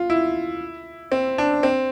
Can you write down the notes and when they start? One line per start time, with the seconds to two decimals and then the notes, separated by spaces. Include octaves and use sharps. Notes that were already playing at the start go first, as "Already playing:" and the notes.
Already playing: F4
0.10 E4
1.12 C4
1.38 D4
1.63 C4